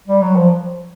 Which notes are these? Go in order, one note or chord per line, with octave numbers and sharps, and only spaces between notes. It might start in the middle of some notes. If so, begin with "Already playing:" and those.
G3
F#3
F3